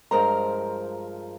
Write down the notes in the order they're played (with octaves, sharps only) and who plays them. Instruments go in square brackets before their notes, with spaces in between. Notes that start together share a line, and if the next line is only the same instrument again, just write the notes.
[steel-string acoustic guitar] G2 F3 G#3 A#4 C5 A#5